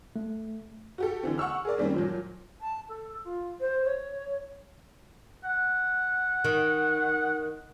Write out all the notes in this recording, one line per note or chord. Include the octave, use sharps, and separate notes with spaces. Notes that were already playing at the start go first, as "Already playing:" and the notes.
A3
F#4 G4 A4
D3 E3 C4
F#5 C#6 E6 F6
G#4 A#4 D5
D#3 G3 A#3 C4 C#4
A#2 F3 F#3
A5
A4
F4
C5
C#5
F#5
D#3